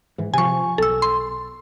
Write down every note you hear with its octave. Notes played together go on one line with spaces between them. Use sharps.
G#2 E3
C3 F3 G#5 C#6
B1 A4 E6
C6